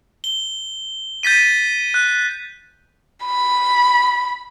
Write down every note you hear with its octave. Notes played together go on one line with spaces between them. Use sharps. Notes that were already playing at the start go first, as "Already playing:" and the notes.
G7
G6 A6 B6 D#7
F#6
B5